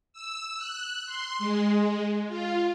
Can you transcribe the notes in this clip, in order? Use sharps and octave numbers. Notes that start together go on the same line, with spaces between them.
E6
F#6
C6
G#3
F4